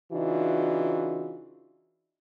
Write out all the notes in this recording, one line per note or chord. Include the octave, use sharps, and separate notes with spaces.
C#3 E3 D4 D#4 F4 F#4